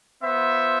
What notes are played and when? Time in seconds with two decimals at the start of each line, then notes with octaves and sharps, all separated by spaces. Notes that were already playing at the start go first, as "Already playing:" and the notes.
0.22 B3 F4 C5 E5